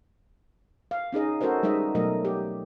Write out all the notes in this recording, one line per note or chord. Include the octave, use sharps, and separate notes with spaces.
F5
C#4 D#4 G#4 D#5
C#4 F#4 A4 A#4 C5 D#5
G3 G#3 D#4 D#5 E5
B2 F#3 A3 A#4 D#5
G4